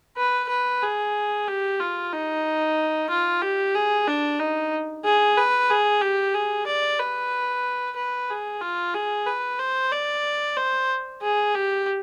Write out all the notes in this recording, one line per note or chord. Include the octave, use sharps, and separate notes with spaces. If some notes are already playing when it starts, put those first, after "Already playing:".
B4
B4
G#4
G4
F4
D#4
F4
G4
G#4
D4
D#4
G#4
B4
G#4
G4
G#4
D5
B4
B4
G#4
F4
G#4
B4
C5
D5
C5
G#4
G4